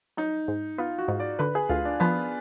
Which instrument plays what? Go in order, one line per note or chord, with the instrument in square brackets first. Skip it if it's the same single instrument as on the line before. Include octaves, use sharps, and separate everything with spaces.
[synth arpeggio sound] F#3 [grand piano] D#4
[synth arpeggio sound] G#2
[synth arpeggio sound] B3 [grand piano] F4
[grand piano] F#4
[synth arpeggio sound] G#2
[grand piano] D5
[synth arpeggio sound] D3 [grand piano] B4
[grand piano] G#4
[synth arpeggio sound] D2 [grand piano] F4
[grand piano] D4
[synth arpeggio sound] F3 [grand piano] B3